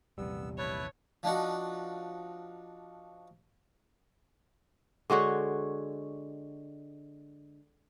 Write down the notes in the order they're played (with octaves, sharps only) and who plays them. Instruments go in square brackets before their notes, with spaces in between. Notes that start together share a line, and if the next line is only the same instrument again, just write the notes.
[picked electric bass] A#1 E2 C3 [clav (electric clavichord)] G3 [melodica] B3 E6
[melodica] E4 B4 A5 [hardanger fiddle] C#5
[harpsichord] F3 D4 D#4 F#4
[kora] D3 G#3 F#4 C#5